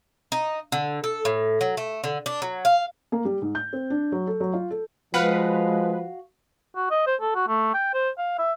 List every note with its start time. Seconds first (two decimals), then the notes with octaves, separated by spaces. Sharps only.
0.32 D#4
0.72 D3
1.04 A4
1.25 A2
1.61 F#3
1.77 A3
2.04 D3
2.26 D4
2.42 F#3
2.65 F5
3.12 A#3
3.25 G3
3.42 G#2
3.55 G6
3.73 C4
3.90 D4
4.12 F#3
4.27 A4
4.40 F#3
4.54 F4
4.71 A4
5.14 F3 G#3 F#4 B4 F5
6.76 F#4
6.90 D#5
7.07 C5
7.21 A4
7.35 F#4
7.48 A3
7.74 G5
7.94 C5
8.18 F5
8.38 E5